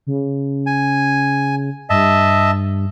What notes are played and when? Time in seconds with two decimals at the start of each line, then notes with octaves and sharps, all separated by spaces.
0.07 C#3
0.66 G#5
1.90 G2 D#5 E5 A5